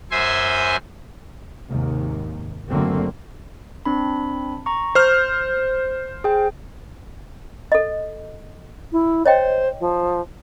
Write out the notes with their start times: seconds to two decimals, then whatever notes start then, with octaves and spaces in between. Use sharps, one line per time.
0.11 F#2 C5 E5 G#5 C6
1.70 D#2 G#2 C3
2.70 F#1 D3 F#3 A3 A#3 C4
3.86 C4 D4 B5
4.66 A#5 C#6
4.95 C5 F6 G6
6.24 G#4 G5
7.72 A4 D#5
8.92 E4
9.26 C5 C#5 D#5 G5
9.80 F3